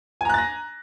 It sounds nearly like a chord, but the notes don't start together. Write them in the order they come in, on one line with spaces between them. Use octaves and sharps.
G#5 A#5 F#6 A6 A#6